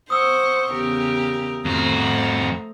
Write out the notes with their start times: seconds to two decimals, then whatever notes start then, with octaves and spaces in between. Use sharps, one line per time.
0.10 C5 F#5 C#6 D#6 E6
0.70 E2 C#3 G4 A#4
1.65 F2 A3 F#4 C5 A#5